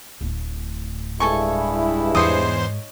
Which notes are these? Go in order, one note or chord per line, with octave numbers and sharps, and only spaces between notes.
D1 A2
G2 G#3 E4 A4 G#5 C#6
E2 G#2 C5 C#5 D#5 C6 D#6